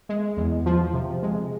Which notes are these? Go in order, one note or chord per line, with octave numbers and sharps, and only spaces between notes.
G#3
E2
F3
C3
G#3